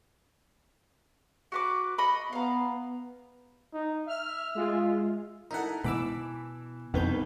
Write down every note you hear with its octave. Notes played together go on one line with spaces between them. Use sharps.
F#4 B4 D6
D#5 B5 C#6
B3 F5 A#5
D#4
E5 F6
G#3 F4
D#4 E4 A4 A#4 F#5
B2 E3 B5 D6 E6
C2 F2 B2 D#4 B4 G6